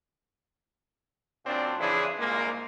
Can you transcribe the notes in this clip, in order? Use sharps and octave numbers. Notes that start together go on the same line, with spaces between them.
F#2 A#2 C4 D4
F2 C#3 E3 D4 E4 G#4
C2 A#2 G#3 A#3